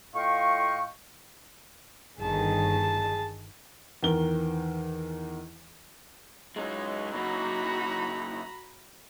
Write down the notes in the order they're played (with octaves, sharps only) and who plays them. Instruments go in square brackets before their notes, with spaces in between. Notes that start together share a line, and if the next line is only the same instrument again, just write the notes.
[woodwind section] A2 F4 D#5 F5 G5 C#6
[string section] G1 D#3 [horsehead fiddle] G#4 A5
[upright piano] E2 D#3 A#4 G7
[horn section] F#3 D#4 E4 [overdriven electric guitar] G#3 C#4
[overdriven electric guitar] C#3 A#3 [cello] F#4 [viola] A#5 B5